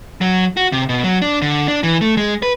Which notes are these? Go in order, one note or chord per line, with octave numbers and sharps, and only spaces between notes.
F#3
F#4
C3
B2
F#3
D4
D3
D4
E3
A3
G#3
B4